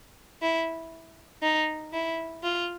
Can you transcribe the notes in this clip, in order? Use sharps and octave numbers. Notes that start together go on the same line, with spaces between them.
E4
D#4
E4
F4